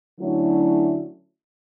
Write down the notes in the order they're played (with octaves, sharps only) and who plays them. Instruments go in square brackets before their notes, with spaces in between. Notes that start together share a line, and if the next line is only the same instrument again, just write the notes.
[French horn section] D3 F#3 A3 C#4 E4